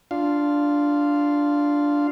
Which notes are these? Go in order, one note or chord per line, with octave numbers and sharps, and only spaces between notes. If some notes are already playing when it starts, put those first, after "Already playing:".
D4 F4 F5